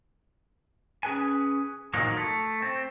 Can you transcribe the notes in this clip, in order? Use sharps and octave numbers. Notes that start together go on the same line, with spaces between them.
C#4 G#4 B4 G#5
A#2 D#3 F3 F#3 A#3
A3
C4